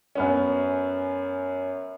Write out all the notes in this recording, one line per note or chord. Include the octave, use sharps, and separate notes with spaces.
F#2 B3 C#4